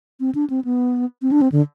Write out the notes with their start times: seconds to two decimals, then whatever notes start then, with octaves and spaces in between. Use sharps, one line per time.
0.20 C4
0.35 D4
0.50 C4
0.65 B3
1.22 C4
1.32 D4
1.42 C4
1.52 D3